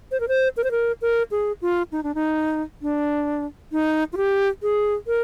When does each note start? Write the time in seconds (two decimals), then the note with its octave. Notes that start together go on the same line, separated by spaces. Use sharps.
0.11 C5
0.20 A#4
0.28 C5
0.57 A#4
0.64 C5
0.71 A#4
1.02 A#4
1.31 G#4
1.62 F4
1.92 D#4
2.03 D4
2.15 D#4
2.82 D4
3.72 D#4
4.13 F4
4.17 G4
4.63 G#4
5.07 A#4